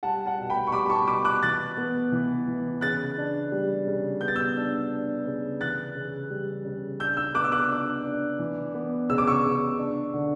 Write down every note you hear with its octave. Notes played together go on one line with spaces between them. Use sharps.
G3 F#5 A5
F#5 A5
B2
G5 B5
C#6
G3 B5 D6
B5
A5 C#6
B2 B5 D6
D6 F#6
E3 F#6 A6
B3
E3
E3
C#3 F#6 A6
D4
G3
C#3
B3 G6
A6
E6 G6
D4
D4
C#3
E3 F#6 A6
C#3
G3
C#3
D4 E6 G6
E6 G6
B3 D6 F#6
E6
D6 F#6
D4
D4
E3
B3
C#3 E6
D6
C#6 E6
C#3
D4
D3